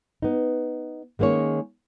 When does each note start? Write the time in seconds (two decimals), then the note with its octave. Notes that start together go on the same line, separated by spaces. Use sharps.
0.22 B3 D#4
1.19 D#3 G#3 A#3 C#4 C#5